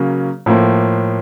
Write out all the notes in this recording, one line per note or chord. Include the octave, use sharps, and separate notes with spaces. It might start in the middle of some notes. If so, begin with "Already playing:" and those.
Already playing: C#3 F#3 A#3 C#4
A2 F3 A#3